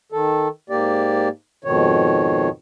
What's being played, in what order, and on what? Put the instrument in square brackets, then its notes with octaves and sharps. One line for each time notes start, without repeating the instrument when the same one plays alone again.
[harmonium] D#3 A4
G#2 A#3 G4 D5
F2 G#2 B2 D#3 C#5